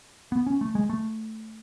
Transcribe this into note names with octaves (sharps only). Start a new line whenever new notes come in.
B3
C#4
A3
G#3
A3